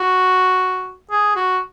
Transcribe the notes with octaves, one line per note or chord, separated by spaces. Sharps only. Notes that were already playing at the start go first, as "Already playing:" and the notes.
Already playing: F#4
G#4
F#4